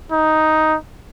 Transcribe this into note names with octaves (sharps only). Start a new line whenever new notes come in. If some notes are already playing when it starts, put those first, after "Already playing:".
D#4